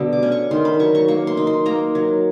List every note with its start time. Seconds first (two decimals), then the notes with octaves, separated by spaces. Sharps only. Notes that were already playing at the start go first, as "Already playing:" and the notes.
Already playing: B2 D3 G3
0.13 D6
0.23 C#4
0.32 C#6
0.51 D#3 C6
0.65 B5
0.79 F#3 C#6
0.95 C#6
1.08 A#3 C#6
1.27 C6
1.37 D#4
1.47 C6
1.66 A#3 A#5
1.95 F#3